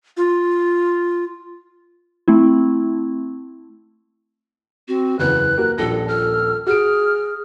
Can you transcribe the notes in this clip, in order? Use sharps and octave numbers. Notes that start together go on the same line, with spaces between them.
F4
A3 C4 E4
C4 F#4
F#1 E2 B4 F#6
A#3 F#4 A#4
D#1 A#1 A4 A5 A#6
A4 F6
F#4 G#4 F6 D7